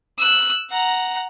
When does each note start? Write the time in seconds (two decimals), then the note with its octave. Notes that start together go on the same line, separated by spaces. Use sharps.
0.18 E6 F#6
0.71 F#5 A#5